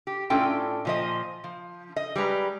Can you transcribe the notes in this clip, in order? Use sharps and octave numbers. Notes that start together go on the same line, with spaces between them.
G4
A2 C#4 D4 F4 A4 G5
A#2 F3 D#5
F3
D#5
G3 G#3 B4 A#5